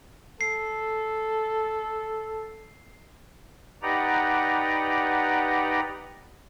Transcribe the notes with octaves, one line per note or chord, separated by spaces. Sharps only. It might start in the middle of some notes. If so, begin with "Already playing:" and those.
A4 C7
D#4 G4 B4 D5 F#5 A#5